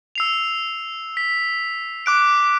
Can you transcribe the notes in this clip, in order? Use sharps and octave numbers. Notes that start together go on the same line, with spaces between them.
E6 C7 F7
B6
D6 F#6 D7